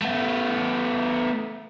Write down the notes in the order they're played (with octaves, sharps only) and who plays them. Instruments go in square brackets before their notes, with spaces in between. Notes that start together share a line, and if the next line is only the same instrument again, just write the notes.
[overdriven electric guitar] A3 B3